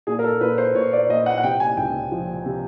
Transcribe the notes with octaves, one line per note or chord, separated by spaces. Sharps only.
A#2 G#4
A#4
A4
A#2 B4
C5
A#2 C#5
D5
A#2 D#5
F#5
F#5
C3 G5
G#5
C#2 G5
F3
C3